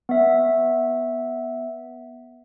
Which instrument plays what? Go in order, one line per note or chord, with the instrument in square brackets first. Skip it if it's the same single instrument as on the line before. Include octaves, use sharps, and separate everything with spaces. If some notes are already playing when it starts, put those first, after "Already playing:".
[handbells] B3 E5